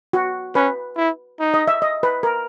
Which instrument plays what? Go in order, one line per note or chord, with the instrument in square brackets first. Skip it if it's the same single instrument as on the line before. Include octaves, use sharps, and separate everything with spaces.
[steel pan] F#4
[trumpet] C#4 [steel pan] B4
[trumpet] E4
D#4
[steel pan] D#5
E5
D#5
B4
A#4